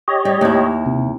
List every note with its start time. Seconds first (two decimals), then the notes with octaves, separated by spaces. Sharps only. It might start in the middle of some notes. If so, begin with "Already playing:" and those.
0.08 G4 C#5 D#5
0.25 G3
0.41 D#2 E4
0.86 C3